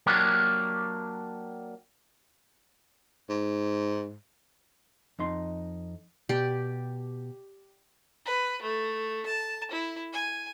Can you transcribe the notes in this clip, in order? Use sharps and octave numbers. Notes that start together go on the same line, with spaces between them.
F#3 A#3 D4 G4
G#2
F2 D#4 C6
B2 G4 D5
B4
A3
A5
E4
G#5